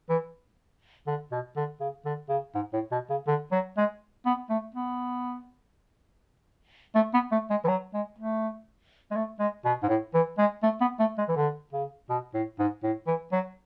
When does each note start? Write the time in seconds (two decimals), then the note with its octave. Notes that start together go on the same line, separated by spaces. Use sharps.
0.10 E3
1.07 D3
1.32 B2
1.56 D3
1.80 C#3
2.05 D3
2.29 C#3
2.55 G#2
2.73 A2
2.92 B2
3.10 C#3
3.27 D3
3.52 F#3
3.77 G#3
4.26 B3
4.50 A3
4.75 B3
6.95 A3
7.14 B3
7.32 A3
7.50 G#3
7.64 E3
7.68 F#3
7.94 G#3
8.18 A3
9.11 G#3
9.16 A3
9.40 G#3
9.65 B2
9.83 G#2
9.89 A2
10.14 E3
10.38 G#3
10.63 A3
10.81 B3
10.99 A3
11.18 G#3
11.29 E3
11.36 D3
11.73 C#3
12.10 B2
12.34 A2
12.59 G#2
12.83 A2
13.07 E3
13.32 F#3